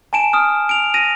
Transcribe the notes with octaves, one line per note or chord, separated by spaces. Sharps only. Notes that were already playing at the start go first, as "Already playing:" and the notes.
G#5 A5 D7 E7
D#6 F6
D7 F7
A#6 D#7